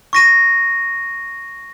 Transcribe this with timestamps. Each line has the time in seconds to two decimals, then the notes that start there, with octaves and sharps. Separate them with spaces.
0.13 C#6 A#6 D#7